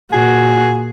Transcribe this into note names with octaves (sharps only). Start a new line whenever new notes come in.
A#2 F#4 G#4